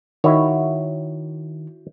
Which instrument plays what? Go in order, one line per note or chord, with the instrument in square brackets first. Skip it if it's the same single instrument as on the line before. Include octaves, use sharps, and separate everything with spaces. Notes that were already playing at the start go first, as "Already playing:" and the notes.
[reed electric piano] D#3 [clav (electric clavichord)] E4 F#4 C#5